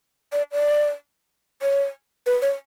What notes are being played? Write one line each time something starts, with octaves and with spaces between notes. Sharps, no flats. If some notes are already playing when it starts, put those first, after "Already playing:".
D5
D5
C#5
B4
C#5